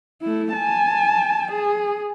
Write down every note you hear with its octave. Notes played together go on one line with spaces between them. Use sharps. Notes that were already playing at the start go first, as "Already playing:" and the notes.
A3 E4
G#5 A5
G#4